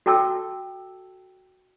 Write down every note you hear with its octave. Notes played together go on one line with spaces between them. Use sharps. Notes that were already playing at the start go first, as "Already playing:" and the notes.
F#4 A4 G5 A5 E6